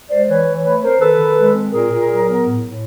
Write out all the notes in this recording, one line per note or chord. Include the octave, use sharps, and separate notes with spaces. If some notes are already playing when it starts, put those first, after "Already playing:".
G#3 C5 D5
E3 B4 C#5
E3
A3 B4 C#5
C4 A#4 C5
D#3 A4 B4
D#3
G#3
C4
A#2 G#4 A#4
A#2
F#3
B3
A2
A2